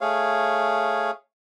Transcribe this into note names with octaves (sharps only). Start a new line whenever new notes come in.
A3 G#4 C#5 F5